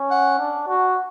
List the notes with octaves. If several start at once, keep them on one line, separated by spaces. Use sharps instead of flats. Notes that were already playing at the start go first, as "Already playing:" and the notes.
Already playing: C#4
F#5
D4
F#4